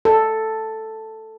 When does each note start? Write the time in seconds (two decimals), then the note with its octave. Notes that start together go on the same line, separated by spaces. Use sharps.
0.05 A4